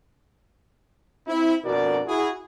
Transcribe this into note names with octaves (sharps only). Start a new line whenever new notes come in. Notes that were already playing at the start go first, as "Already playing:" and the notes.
C4 E4
F2 B2 D4 F#4 A#4 D5
E4 F#4 G#4